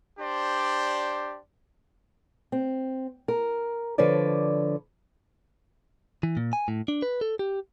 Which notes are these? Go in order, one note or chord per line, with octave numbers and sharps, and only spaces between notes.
D4 G4 C5 D5
C4
A#4
D3 F3 B4 C#5 D5
E3
A#2
G#5
A2
D4
B4
A4
G4